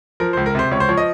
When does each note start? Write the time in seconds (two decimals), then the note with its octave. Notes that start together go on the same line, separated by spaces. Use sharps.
0.20 F3 A#4
0.33 C#2 C5
0.46 A#4
0.55 C3 C5
0.71 C#2 C#5
0.80 C5
0.89 F3 C#5
0.97 D#5